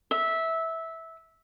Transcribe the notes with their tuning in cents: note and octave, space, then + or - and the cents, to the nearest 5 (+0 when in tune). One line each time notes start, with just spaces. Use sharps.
E5 -15